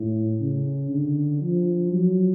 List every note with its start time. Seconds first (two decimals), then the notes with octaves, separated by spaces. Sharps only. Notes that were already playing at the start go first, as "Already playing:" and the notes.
Already playing: A2
0.40 C#3
0.91 D3
1.41 F3
1.92 F#3